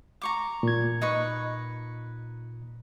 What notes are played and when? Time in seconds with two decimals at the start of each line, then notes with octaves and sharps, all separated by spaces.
0.22 A#5 C#6 D6
0.63 A#2 G#6
1.02 D#4 B4 C#6